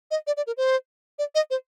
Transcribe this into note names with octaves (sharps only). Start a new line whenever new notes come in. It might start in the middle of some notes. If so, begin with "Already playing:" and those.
D#5
D5
D5
A#4
C5
D5
D#5
C5